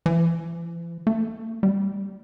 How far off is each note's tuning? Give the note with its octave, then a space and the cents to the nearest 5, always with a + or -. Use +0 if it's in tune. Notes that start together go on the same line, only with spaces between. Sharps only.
E3 +45
A3 +45
G3 +15